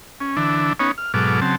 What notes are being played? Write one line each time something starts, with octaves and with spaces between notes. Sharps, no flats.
C#4
D3 E3 D4
B3 C#4 D#4 C#5
F6
G#2 B2 F#3 A4 D6 F6
C#3 F#3 C4 A5